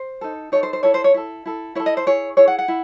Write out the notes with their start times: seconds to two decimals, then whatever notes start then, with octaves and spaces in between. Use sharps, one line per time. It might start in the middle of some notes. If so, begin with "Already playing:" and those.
Already playing: C5
0.21 D#4 A4
0.52 D#4 A4 C#5
0.63 C5
0.73 C5
0.83 E4 A4 C#5
0.94 C5
1.04 C#5
1.14 E4 A4
1.46 E4 A4
1.75 E4 C#5
1.80 A4
1.86 D#5
1.97 C5
2.06 E4 G#4 C#5
2.37 E4 G#4 C#5
2.48 F#5
2.58 F#5
2.68 E4